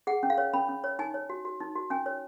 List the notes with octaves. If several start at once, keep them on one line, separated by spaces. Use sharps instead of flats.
G#4 F#5
C#4
F5
C#5
C#4 B5
C#4
C#5
D#4 G#5
C#5
F#4
F#4
D#4
F#4
C#4 G#5
C#5